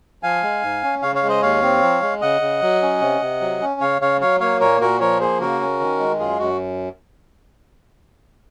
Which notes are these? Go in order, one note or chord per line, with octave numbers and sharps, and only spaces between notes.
F3 F5 G#5
G#3
G#2
C#4
C#3 C#5 F5
C#5 F5
G#3
C5 D#5
D#2 C#5 F5
C4
F3
G#3
C#3 D#5 F#5
C#3
F#3
C#4
C3
C3
F#3
C#4
C#3 C#5 F5
C#3 C#5 F5
F#3 C#5 F5
A#3 C#5 F5
A#2 A#4 C#5
A#2 F#4 A#4
F3 A#4 C#5
A#3 G#4 C5
C#3 F#4 A#4
C#4
D#3
G#3
F#2 F4 G#4
F#2 F#4